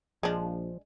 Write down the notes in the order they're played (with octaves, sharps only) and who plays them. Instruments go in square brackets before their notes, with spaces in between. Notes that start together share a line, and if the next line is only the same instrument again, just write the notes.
[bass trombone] A#1 [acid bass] F3 [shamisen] G#3 D4